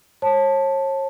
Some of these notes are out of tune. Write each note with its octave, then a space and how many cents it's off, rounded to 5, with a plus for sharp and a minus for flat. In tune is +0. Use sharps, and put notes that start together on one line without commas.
C#5 -40 A5 +0